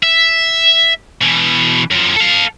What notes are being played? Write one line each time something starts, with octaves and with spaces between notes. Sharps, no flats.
E5
B2 E3
F#2 F3
A4 F5